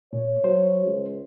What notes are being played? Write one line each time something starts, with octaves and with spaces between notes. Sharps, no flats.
A#2 C#5
F#3 C5
C#2